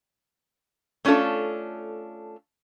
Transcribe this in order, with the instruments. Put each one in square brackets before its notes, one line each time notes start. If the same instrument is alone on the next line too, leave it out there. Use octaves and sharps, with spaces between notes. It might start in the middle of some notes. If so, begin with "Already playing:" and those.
[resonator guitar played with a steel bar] A3 C#4 D4 F4 A4